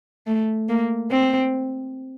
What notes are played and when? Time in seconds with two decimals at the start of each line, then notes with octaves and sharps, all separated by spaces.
0.27 A3
0.69 A#3
1.11 C4